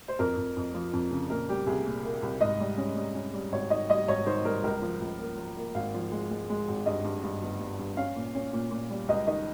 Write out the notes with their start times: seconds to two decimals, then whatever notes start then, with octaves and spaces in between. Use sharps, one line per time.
0.08 C5
0.19 F2 A#4
0.37 F2
0.57 F2
0.74 F3
0.93 F2
1.11 C#3
1.30 A#2 A#4
1.49 G3 G4
1.67 C2 G#4
1.86 A#2
2.04 A#3
2.22 C2
2.41 G#2 D#5
2.60 G3
2.78 C#4
2.96 G3
3.15 C#4
3.33 G3
3.52 G#1 C#5
3.70 D#3 D#5
3.90 G3 D#5
4.08 G#1 C#5
4.26 D#3 C5
4.45 G3 A#4
4.63 C#2 A#4
4.82 F3
5.01 C#2
5.19 A#3
5.37 F3
5.57 A#3
5.75 G#1 F5
5.94 F3
6.11 G#3
6.31 G#3
6.50 G#3
6.68 G#1
6.86 G2 D#5
7.04 G2
7.23 G2
7.42 G1
7.60 G1
7.79 G2
7.97 C#4 F5
8.16 A#2
8.35 C#4
8.53 A#2
8.71 A#2
8.90 G3
9.08 C#2 D#5
9.27 D#3 D#5